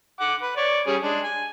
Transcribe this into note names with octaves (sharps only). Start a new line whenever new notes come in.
F#5 D6
B4
C#5 D5
G3 C#4 G#4
G#3 D4
G#5